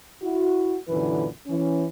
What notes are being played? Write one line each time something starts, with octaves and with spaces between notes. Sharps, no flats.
E4 F#4
F#2 A#2 D3 E3 B4
E3 C#4